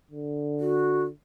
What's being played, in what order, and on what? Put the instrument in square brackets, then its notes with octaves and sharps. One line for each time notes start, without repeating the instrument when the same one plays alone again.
[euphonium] D3
[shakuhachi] F#4